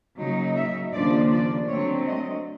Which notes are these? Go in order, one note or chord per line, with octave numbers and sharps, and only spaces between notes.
C#3 F#3 A#3 D#4
E5
D#2 C#3 F3 A#3 D4 D5
D5
D3 F#3 A3 C4 C#5
D#5